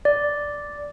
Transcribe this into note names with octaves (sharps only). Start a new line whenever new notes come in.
D5